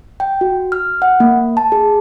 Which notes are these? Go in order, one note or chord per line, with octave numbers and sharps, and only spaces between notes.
G5
F#4
F6
F#5
A#3
A5
G#4